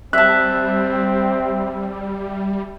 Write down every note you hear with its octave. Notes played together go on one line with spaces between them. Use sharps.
G3 C4 E5 A5 F#6